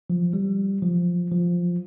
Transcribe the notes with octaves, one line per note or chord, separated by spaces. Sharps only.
F3
G3
F3
F3